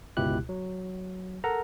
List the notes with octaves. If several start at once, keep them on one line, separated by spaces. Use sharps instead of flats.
G1 C#2 B2 E4 G4 F#6
F#3
A4 A#4 F#5 A#5